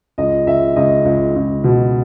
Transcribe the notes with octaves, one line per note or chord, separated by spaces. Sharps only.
C#2 D#5
C#2 E5
C#2 D#5
C#2
C#2
B2